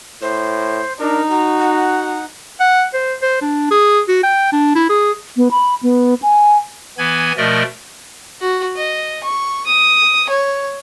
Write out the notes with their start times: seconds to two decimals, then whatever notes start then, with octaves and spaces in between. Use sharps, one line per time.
0.22 A2 C5
1.00 D4 D#4 A#4
1.31 F#4 A#5
1.59 F#5
2.60 F#5
2.93 C5
3.22 C5
3.42 D4
3.71 G#4
4.08 F#4
4.23 G5
4.52 D4
4.75 E4
4.89 G#4
5.37 B3
5.51 B5
5.83 B3
6.23 G#5
6.98 E3 B3 G#5 B5 G#6
7.37 B2 F3 A3 A#4 D5 D#5
8.41 F#4
8.76 D#5
9.23 C#6
9.66 D#6
10.29 C#5